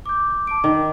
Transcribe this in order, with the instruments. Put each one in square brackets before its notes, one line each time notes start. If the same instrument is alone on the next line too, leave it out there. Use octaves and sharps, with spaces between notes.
[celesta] D6 G6
A5 D6 D7
[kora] D#3